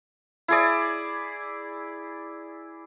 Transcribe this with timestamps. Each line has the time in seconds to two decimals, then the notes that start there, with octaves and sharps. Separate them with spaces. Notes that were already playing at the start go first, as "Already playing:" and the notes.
0.48 E4 G#4 D5